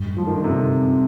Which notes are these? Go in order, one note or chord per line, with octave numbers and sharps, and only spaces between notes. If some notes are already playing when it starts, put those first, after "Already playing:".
Already playing: G2 G3
F3 F4
D#3
D3
C3 C4